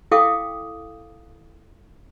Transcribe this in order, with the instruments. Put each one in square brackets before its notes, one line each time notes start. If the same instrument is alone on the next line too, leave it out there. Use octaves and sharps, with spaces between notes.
[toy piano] E4 A4 F5 G5 D6 D#6